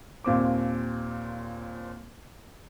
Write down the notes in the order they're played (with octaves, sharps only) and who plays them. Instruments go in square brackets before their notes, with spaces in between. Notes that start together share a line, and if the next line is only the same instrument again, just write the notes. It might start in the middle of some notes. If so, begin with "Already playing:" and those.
[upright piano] D#2 A#2 C4 D6